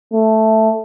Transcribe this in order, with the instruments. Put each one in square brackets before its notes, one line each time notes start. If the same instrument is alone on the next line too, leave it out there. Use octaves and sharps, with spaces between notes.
[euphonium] A3